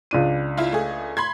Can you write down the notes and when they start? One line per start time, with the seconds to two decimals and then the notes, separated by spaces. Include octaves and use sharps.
0.11 C#2 D4 D#7
0.57 E4 F4
0.72 A3 G#4
1.17 B5 C6 G#6